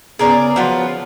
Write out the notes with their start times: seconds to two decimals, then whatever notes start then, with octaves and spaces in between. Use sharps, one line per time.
0.19 C#3 B3 G#4 A#4 D5
0.56 F3 F#3 B3 F4